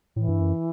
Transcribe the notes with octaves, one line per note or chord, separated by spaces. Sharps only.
A2 E3
G2
F#2